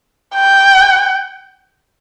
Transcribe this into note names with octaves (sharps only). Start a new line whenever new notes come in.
G5